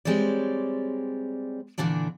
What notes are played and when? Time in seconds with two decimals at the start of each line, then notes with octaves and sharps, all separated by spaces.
0.05 G3 G#3 C4 C#5 D5
1.78 A#2 D3 E3 D4 D5